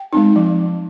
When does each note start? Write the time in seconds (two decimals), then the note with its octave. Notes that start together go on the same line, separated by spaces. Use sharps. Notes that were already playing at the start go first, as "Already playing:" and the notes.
Already playing: G5
0.13 G#3 C4 D#4
0.36 F3